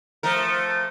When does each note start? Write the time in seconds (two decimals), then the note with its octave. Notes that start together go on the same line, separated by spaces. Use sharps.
0.23 F3 A3 A#4